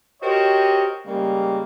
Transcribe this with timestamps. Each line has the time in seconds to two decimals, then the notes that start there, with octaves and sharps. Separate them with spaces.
0.23 F#4 G4 A#4 C5 C#5 D#5
1.06 C#3 G3 G#3 A#3